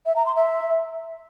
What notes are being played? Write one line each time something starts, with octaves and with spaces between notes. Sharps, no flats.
E5
A#5
C6
E5